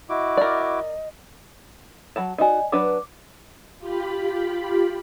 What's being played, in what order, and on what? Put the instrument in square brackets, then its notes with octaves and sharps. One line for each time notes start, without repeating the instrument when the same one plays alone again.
[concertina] E4 F#4 D6 [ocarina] D#5
[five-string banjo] A#4 D5
F#3 F#4 A5
[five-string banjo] D#4 F#4 [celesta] D5 D#5 G#5
[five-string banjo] F#3 D4 B4 [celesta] D6
[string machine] F4 G4 B5